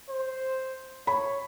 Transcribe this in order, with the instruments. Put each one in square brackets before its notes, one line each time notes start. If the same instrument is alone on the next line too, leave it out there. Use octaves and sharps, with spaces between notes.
[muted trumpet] C5
[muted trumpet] C#5 [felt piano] B5